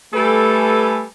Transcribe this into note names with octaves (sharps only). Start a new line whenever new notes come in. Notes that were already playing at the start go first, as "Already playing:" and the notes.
G3 A3 A4 B4 G#5